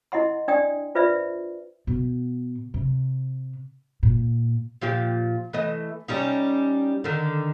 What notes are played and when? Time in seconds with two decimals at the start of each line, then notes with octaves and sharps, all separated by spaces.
0.12 E4 D#5 F#5 C6
0.48 D4 D5 G5 D#6
0.95 F4 B4 C5 D5 E5
1.87 B2
2.74 C3
4.03 A#2
4.82 A#2 F3 G4
5.53 E3 A3 D#5
6.08 G3 C#4 D#4
7.04 D3 D#3